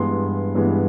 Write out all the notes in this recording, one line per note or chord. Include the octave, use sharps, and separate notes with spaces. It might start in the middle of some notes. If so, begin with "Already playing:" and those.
Already playing: G2 E3 G#3 B3 C6
G2 E3 G#3 B3